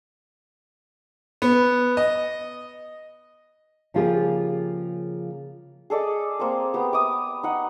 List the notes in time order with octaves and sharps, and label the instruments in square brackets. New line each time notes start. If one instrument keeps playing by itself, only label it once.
[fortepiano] B3
D#5
[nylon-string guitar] C#3 F3 A#3 F4 G4 G#4
[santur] G#4 A4 D5 D#5
A#3 C4 A#4
B3 G4
D6 D#6
D#4 F#5